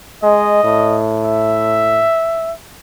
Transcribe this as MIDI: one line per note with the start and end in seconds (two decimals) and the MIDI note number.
0.23 0.61 56
0.23 0.98 75
0.64 2.06 45
1.25 2.53 76